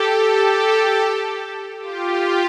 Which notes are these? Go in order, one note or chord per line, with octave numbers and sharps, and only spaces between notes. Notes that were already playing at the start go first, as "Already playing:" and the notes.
Already playing: G4 A4
G4 A4
F4 G4